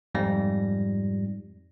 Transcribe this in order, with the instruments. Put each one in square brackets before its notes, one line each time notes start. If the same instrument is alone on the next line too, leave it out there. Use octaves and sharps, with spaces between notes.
[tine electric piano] F2 G#2 G3 A#6